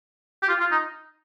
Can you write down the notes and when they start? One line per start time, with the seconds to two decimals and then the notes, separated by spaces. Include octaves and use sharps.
0.42 G4
0.49 F4
0.60 F4
0.72 D#4